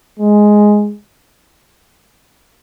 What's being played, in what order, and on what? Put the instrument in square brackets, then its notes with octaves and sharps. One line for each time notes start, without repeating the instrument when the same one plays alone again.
[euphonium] G#3